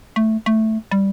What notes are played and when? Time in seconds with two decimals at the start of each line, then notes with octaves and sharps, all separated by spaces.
0.16 A3
0.46 A3
0.91 G3